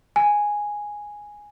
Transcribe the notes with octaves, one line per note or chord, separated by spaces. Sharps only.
G#5